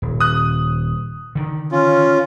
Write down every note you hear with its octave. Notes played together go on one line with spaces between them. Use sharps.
D#1
D#6 F#6
D3 D#3
C#4 F4